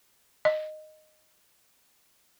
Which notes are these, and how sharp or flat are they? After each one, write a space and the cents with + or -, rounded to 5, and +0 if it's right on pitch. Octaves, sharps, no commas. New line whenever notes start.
D#5 -10